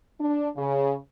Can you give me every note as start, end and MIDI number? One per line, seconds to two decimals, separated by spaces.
0.20 0.50 62
0.57 0.97 49